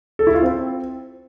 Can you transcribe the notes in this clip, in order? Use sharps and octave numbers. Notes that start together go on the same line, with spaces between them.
A4
E4
F4
C4